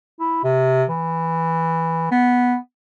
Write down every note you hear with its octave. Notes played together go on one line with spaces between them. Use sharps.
E4
C3
E3
B3